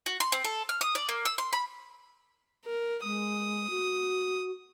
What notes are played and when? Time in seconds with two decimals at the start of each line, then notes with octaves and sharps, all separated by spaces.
0.06 F#4
0.20 C6
0.32 C4
0.44 A4
0.69 F6
0.81 D#6
0.95 D5
1.09 A#3
1.25 E6
1.38 C6
1.53 B5
2.65 A#4
3.03 G#3 D#6
3.70 F#4